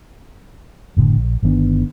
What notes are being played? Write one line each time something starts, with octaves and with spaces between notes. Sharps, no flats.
F#1 A2 D3
A#1
G1 D#3 B3 D4